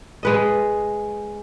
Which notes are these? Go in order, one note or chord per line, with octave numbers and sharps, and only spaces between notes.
G#3 B4 D#5